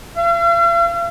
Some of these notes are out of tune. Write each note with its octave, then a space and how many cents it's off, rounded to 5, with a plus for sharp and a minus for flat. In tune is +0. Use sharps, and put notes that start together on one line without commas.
F5 -45